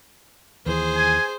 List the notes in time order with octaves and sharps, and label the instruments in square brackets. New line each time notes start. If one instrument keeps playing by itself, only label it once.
[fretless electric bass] D#2 E3 [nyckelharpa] G#4 C5
[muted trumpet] G#5